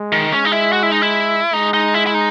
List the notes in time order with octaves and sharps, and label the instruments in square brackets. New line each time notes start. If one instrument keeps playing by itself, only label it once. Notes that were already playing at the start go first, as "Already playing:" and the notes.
Already playing: [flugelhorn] G#3
[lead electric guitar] D#3
[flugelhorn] G#3 [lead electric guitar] C#4
[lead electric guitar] D#4
E4
F#4
E4
D#4
E4
[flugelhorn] G#3 [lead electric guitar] D#4
[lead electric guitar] D#4
E4
E4
D#4